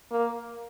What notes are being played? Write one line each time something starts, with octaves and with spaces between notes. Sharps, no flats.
A#3